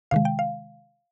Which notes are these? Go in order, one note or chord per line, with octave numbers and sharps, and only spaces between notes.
C3 D#3 G#3 F5
G5
F5